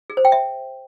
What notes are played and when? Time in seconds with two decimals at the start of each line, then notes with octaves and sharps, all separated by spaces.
0.10 G#4
0.17 C5
0.25 G5
0.32 E5